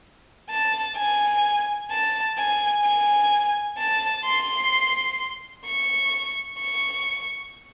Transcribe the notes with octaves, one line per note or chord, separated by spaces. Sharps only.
A5
G#5
A5
G#5
G#5
A5
C6
C#6
C#6